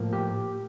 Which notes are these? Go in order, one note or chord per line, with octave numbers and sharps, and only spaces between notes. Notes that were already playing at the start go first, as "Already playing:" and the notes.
Already playing: A2 F3 A#3
G4